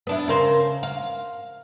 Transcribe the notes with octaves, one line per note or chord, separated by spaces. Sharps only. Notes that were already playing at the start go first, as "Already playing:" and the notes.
B3 D4 E4
C#3 A#4 C5
F5